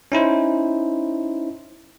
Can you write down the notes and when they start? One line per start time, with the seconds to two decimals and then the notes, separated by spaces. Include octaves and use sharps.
0.12 C#4 D#4 E4 C5